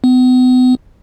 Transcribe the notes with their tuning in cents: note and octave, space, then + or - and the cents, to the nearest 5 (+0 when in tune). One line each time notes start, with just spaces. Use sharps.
B3 +40